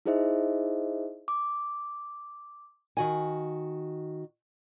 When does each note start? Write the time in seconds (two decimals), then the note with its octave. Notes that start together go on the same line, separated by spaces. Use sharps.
0.06 D#4 E4 G#4 C5 D#5 E5
1.28 D6
2.97 D#3 F#4 G#5